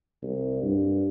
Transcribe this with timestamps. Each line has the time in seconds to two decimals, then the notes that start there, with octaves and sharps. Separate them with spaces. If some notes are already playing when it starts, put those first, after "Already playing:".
0.23 C2
0.63 G2